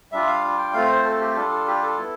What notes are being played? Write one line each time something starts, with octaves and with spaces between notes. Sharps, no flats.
G3 D4 F4 E5
F5
G5
A3 C4 F4 F5
C5
A4
G4
G3 D4 F4 A4
A4
G4
A4
B3 E4